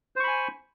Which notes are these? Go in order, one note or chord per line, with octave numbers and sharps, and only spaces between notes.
C5 G#5 B5 C#6